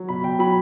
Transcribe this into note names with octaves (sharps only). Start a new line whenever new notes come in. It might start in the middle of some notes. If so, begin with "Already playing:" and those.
Already playing: F#3
B2 B5
B2 G5
F#3 B5